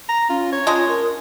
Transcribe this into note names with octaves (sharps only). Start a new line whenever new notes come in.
A#5
C#4 F4
C#5
G#3 D4 F4 D#5
A#4